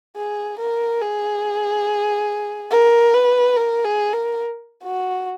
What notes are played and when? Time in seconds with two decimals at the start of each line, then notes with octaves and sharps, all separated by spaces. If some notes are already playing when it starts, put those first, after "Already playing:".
0.17 G#4
0.59 A#4
1.02 G#4
2.71 A#4
3.14 B4
3.57 A#4
3.85 G#4
4.13 A#4
4.84 F#4